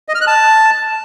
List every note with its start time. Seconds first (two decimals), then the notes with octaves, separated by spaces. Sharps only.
0.09 D#5
0.15 F6
0.21 F#6
0.27 A5